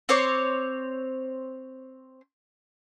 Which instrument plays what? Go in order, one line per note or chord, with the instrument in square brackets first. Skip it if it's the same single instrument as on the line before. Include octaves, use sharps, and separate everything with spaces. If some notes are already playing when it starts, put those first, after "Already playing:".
[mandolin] C4 C5 C#5 D6